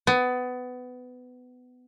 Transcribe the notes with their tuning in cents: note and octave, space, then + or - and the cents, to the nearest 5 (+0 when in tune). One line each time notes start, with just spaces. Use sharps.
B3 +20